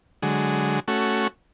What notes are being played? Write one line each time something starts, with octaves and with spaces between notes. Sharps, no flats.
D3 F#3 G#3
A3 C#4 F#4